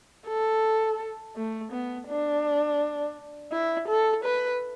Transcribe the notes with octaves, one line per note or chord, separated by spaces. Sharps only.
A4
A3
B3
D4
E4
A4
B4